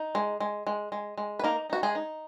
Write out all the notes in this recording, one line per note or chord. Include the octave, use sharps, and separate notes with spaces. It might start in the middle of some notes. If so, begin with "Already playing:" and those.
Already playing: D#4
G#3
G#3
G#3
G#3
G#3
B4
A#3 D#4 A#4
D#4 F#4
G#3 G#4
D#4